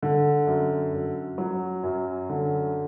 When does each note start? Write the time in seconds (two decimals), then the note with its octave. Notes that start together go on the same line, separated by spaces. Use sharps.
0.02 D3
0.47 F#2
0.93 F#2
1.38 F#3
1.83 F#2
2.29 D3